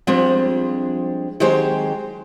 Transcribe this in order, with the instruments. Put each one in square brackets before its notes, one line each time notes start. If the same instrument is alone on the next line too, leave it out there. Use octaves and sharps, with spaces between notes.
[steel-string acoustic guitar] F3 G3 G#3 C4 D4
D#3 F#3 G#3 C4 G4 C5